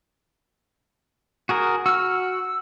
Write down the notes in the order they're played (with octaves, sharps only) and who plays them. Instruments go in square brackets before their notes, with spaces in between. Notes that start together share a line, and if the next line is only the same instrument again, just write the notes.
[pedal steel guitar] F#4 G#4 A#4
[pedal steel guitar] F#4 F6 [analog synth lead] E6